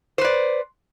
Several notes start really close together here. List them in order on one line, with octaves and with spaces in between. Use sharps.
C5 B4 D5